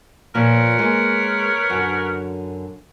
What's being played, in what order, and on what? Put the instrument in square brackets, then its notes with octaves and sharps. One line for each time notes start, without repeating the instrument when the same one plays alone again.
[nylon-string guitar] A#2 F3 [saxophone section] A#4 B4 C#5
[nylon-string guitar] G#3 A#3
F#2 D3